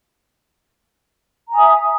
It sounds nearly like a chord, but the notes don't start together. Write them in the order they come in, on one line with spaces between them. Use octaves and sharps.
A#5 G#5 D#6 E5